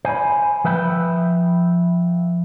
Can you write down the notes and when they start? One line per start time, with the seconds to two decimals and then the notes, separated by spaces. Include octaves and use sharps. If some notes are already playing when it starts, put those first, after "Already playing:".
0.05 C5 G#5 A#5 B5
0.64 F3 B4 E5 G5 B5